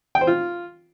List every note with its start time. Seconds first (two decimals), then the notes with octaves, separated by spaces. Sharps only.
0.15 G5
0.21 C5
0.27 F4